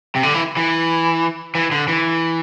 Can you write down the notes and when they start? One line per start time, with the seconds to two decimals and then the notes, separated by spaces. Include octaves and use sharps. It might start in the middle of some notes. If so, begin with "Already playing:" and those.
0.16 C3
0.23 D3
0.34 E3
0.57 E3
1.55 E3
1.72 D3
1.88 E3